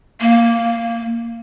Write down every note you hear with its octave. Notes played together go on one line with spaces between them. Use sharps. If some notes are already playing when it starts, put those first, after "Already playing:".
A#3